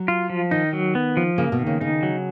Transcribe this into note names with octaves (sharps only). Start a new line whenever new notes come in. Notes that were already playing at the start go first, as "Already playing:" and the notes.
Already playing: F#3
F4
F3
D#3 D#4
F#3
B3
F3
C#3 A#3
B2
D#3
C#3
C#3 D#4
F#3